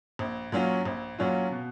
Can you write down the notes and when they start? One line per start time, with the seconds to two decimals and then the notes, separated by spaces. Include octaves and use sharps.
0.19 A#1
0.52 A#2 F#3 C#4 F4
0.85 A#1
1.18 A#2 F#3 C#4 F4
1.52 B2